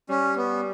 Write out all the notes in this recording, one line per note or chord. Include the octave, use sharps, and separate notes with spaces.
G3 C#4
B3